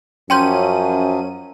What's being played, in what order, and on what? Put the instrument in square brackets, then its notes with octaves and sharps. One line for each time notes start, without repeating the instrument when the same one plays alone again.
[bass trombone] F#2 [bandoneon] F3 F#3 [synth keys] C#4 D#7 [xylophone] G5 C6 G6